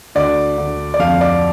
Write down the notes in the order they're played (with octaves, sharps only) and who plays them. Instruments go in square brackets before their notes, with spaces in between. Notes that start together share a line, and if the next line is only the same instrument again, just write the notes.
[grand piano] D2 D5
D2
D5
F2 F5
D5